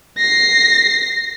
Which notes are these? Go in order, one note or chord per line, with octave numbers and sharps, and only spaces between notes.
A#6 C7